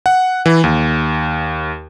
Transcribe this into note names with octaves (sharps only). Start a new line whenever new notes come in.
F#5
E3
D#2